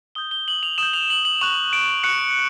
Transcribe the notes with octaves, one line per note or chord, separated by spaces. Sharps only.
D#6 G6 G7
G7
F#7
F7
D#6 G6 E7
F7
F#7
F#7
C#6 F#6 F7
D7
C#6 F#6 C#7